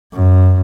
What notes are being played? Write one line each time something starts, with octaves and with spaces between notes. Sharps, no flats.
F#2